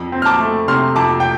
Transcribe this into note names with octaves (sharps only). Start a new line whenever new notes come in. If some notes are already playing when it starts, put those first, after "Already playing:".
Already playing: F2
C4
F6
A5 D6
A3
C3 C6 F6
F2 A5 D6
G5